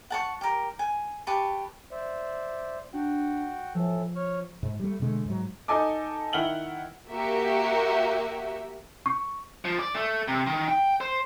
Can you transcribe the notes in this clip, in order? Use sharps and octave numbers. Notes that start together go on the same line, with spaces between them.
F#5 A5 C#6
G4 A#4
G#5
G4 B4 A5 C#6
C5 D5 E5
D4 F#4 F#5 G5
A2 E3 F3 A4
C#5 C#6 F6
G#2
G3 A3
B2 D3 G#3 A3
G#2 F#3
D#4 A4 D#5 G#5 A5 D6
D#3 E4 F#5 F6 F#7 G7
A#3 F#4 G4 E5
C#6
F3
D5
A3
C3
D#3
G5
C5